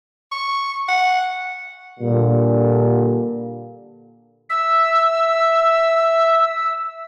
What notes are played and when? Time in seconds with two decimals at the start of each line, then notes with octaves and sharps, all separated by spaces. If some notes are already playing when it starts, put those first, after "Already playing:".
0.32 C#6
0.88 F#5
2.00 A#2 D3 G3
4.50 E5 E6